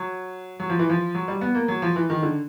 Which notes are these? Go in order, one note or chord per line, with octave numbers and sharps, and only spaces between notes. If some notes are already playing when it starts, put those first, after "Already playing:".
Already playing: F#3
F#3
F3
E3
F3
F#3
G3
B3
A#3
F#3
F3
E3
D#3
D3